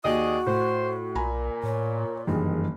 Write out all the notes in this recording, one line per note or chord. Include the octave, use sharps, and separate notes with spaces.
D#2 F#4 G#4 D5 D#5
A2 C5
B1 A#2 G#5 A#5 B5
A2 C#5
F#1 G2 D#3 E3 G#4